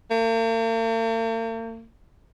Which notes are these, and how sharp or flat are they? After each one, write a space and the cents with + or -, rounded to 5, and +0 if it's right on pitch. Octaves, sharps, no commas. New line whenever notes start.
A#3 -45